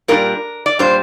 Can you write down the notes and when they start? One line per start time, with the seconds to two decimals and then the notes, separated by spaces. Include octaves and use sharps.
0.08 A#2 G3 D4 A#4
0.66 D5
0.79 A#2 G3 D4 C5